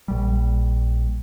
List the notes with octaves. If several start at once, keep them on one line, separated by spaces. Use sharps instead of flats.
A#1 G3